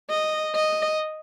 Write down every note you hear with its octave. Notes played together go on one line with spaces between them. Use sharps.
D#5
D#5